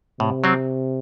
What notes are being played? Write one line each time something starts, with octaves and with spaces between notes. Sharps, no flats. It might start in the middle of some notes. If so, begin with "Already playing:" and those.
A2 C3
F#3 C4